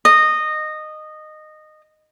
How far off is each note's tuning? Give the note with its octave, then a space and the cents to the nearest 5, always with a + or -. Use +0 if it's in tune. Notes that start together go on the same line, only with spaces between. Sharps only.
D#5 -15